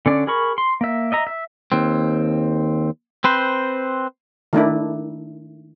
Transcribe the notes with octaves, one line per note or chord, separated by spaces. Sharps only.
D3 C#4 D5
G#4 A#4 B5 C#6
C6
A#3 E5
D#5 E5 A#5
E5
D#2 C4
C4 B4 C5
D#3 A3 D4 E4